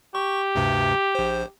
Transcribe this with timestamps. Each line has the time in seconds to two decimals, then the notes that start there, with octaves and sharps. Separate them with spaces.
0.15 G4 C#6
0.55 D2 G2 C3
1.15 A#1 C5